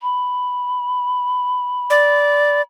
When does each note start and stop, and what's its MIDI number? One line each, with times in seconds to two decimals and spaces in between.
0.02 2.62 83
1.90 2.61 74